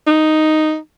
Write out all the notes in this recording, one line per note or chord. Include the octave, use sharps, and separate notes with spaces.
D#4